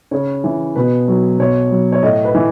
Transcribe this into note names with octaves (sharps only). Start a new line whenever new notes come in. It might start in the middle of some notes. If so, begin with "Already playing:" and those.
C#3 C#5
E3
B2 B4
F#3
B2 C#5
F#3
C#5
A2 D#5
B4
E3